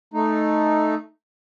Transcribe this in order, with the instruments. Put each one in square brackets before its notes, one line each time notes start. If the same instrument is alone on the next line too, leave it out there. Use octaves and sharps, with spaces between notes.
[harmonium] A3 D#4